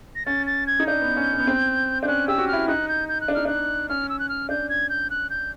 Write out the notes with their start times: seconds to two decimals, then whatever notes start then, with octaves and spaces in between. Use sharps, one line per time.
0.15 A#6
0.26 C#4 A6
0.47 A6
0.67 G#6
0.80 D#4
0.87 D4 G6
1.01 B3
1.17 C#4
1.33 C#4
1.40 B3
1.47 C4
2.03 D4 G6
2.08 C#4 F#6
2.28 G4 E6
2.38 F#4
2.48 E4 F6
2.68 D#4 F#6
2.88 G6
3.09 G6
3.21 F#6
3.28 D4
3.34 D#4 F6
3.45 D4 F#6
3.89 C#4 F6
4.09 E6
4.19 F#6
4.29 F6
4.49 D4 G6
4.69 G#6
4.89 G6
5.10 F#6
5.30 G6